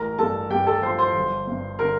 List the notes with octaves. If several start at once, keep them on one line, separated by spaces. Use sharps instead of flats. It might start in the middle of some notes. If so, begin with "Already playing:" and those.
Already playing: A1 A#4 A#5
G2 A4 A5
G2 G4 G5
A4 A5
F3 C5 C6
C5 C6
G1
G2
D3 A#4 A#5